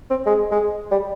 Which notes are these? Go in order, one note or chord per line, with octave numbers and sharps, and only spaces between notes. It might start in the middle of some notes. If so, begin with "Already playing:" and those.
C4
G#3
G#3
G3